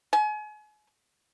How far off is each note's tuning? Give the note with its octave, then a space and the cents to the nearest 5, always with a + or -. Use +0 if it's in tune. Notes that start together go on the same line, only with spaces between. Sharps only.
G#5 +35